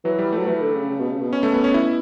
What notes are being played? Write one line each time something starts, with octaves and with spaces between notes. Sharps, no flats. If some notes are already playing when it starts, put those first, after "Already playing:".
E3 F#3
G3
A3
F#3
E3 A3
D3
C#3
C#3
B2
C#3
B2
C#4
A3
B3
C#4
E4